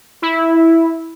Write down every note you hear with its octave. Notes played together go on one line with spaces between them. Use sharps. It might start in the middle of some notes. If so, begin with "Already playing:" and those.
E4